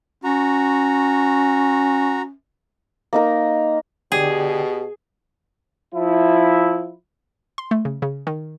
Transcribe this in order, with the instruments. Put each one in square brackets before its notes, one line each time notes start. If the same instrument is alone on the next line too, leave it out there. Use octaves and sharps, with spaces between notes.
[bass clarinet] C#4 [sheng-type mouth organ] F#4 A#5
[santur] A#3 D#4 A#4
[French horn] B2 [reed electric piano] D3 D5 G5 [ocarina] G4 [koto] G#4
[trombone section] F3 E4
[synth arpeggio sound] C6
A3
C#3
C#3
D#3